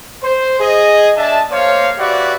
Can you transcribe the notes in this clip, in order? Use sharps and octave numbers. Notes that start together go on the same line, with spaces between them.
C5
G#4 D#5
D4 E5 A5
A#3 C5 C#5 F5
F#4 G4 B4 D5 E5